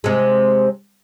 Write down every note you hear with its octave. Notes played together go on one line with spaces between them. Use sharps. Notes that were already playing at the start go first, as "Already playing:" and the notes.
C3 G#3